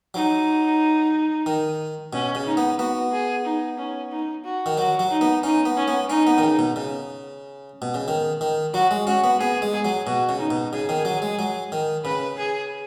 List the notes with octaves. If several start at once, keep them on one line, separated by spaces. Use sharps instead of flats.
F#3 D#4
D#3
B2 C#4
C#3
D#4
B3
B3 F#4
G#4
D#4
C#4
D#4
F#4
D#3
F#3 F#4
F#3
D#4
B3
C#4 D#4
B3
C#4
B3
C#4 D#4
B3
D#3
C#3
B2
C#3
B2
C#3
D#3
D#3
F#3 F#4
G#3
C#4 F#4
B3
B3 G#4
G#3
G#4
F#3
B2 F#4
C#3
D#4
B2
C#3 G#4
D#3
F#3
G#3
F#3
D#3
C#3 B4
G#4